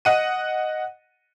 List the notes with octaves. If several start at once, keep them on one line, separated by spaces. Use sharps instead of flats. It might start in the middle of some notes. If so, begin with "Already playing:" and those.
D#5 F#5 D#7